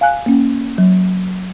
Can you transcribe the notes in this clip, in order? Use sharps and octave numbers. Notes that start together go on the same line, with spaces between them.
F5 G#5 F#6
A#3 C#4
F#3